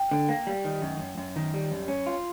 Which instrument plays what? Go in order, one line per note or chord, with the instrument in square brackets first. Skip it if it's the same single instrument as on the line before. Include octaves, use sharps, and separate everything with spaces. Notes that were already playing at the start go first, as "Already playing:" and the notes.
Already playing: [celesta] G5
[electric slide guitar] D3
A#3
G3
D#3
F#2
F#2
F#2
D#3
G3
F#2
C#4
F4